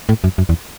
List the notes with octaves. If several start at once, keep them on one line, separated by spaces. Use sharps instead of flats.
A2
F#2
F#2
E2